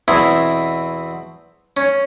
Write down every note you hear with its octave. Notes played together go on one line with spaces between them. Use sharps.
E2 B2 C4 E4
C#4